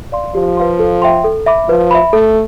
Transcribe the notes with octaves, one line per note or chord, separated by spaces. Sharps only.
D5 F5 C6
F3 G4
B4 F5 C6
A4
E5 G5 C6
A4
E5 B5 D6
F3 B4
E5 B5
A3 A4